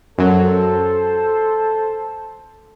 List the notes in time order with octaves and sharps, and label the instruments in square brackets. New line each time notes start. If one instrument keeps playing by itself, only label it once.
[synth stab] F#2 F#3 [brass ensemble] A4 C5